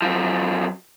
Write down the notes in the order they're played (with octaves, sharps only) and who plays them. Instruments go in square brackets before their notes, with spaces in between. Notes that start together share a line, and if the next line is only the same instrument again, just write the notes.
[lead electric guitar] F#2 F3